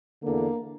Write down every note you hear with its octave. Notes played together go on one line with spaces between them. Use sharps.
E2 D3 A#3